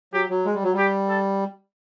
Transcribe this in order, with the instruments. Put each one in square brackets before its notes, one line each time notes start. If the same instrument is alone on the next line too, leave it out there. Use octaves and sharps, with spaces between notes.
[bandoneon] F#3 [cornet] G4
[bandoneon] F#3
G#3
G3
F#3
[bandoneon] G3 [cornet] G4
[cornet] A4